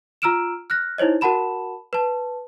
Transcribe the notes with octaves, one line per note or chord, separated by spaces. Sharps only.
F4 A#5 E6 F6 D7 E7
F6 F#6 A#6
D#4 E4 C5 C#5 D#5
F#4 A#4 F#5 A5 B5 E7
B4 A5